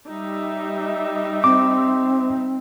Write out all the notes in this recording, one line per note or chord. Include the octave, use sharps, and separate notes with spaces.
G3 D#4 E5
C4 D6